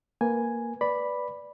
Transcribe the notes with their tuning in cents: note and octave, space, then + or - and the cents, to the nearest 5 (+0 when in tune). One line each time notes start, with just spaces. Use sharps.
A#3 +0 B4 +5 G#5 +0
B4 +0 D5 +0 B5 +0